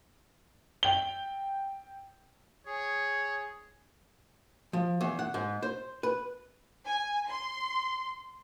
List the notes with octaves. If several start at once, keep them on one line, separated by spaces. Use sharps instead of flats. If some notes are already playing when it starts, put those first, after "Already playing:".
G5 G7
G#4 C#5
F3
E2
F#5
G#2
C5
B4
G#5
C6